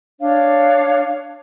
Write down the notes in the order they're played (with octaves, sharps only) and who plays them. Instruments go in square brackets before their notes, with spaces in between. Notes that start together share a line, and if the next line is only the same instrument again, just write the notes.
[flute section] D4 C#5 F5